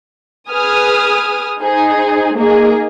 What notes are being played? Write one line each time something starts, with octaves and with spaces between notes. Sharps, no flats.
G#4 B4 G#5 D#6 F6
D#4 G#4 C5
A#3 D#4 G#4